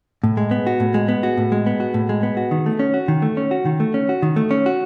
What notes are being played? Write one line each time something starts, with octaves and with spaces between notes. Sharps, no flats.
A2
G#3
B3
F#4
A2
G#3
B3
F#4
A2
G#3
B3
F#4
A2
G#3
B3
F#4
D#3
A3
C#4
F#4
D#3
A3
C#4
F#4
D#3
A3
C#4
F#4
D#3
A3
C#4
F#4